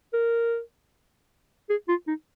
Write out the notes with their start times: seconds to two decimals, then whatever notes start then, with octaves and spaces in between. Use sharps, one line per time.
0.13 A#4
1.70 G#4
1.88 F4
2.08 D#4